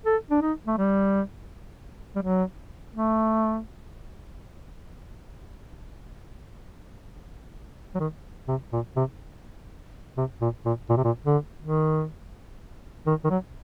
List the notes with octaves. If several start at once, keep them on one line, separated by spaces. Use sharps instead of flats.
A4
D4
D#4
A3
G3
G3
F#3
A3
F#3
D#3
C3
A#2
C3
C3
A#2
A#2
A#2
C3
A#2
D3
D#3
D#3
D#3
F#3